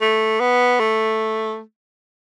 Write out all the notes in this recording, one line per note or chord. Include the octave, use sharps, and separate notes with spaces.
A3
B3
A3